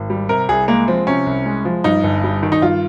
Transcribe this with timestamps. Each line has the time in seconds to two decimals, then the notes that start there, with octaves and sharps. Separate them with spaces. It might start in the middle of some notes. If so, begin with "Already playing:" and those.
Already playing: G#1
0.10 G3
0.29 C3 A#4
0.49 C2 G#4
0.68 G#3 A#3
0.88 F3 C4
1.07 C3 C#4
1.26 C2
1.46 G#3
1.65 F3
1.84 G2 D#4
2.04 G1
2.24 G3
2.43 D#3
2.52 D#4
2.62 G2 F4